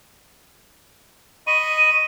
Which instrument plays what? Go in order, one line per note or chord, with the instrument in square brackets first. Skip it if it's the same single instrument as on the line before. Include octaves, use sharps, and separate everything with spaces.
[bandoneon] D#5 B5 C#6 [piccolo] D#7